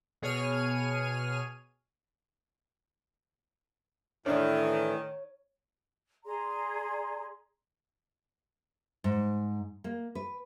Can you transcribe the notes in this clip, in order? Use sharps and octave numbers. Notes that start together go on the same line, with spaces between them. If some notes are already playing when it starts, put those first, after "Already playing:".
B2 G#4 C#5 G#5 F6 D#7
A2 D#3 E3 D4 C#5
G#4 D5 A#5 C6
G#2
A#3
B4